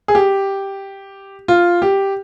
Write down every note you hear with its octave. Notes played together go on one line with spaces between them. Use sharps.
G#4
G4
F4
G4